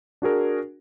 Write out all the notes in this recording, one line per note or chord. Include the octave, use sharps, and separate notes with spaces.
D4 F#4 G#4 A#4